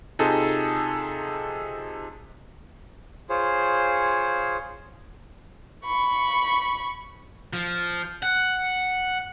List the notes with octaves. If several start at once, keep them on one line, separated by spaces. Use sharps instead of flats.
C3 D#4 F4 G#4 A4
F4 G#4 C5 C#5
B5 C#6
F3
F#5